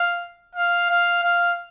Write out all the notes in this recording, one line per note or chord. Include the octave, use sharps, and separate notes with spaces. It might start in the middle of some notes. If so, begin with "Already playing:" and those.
Already playing: F5
F5
F5
F5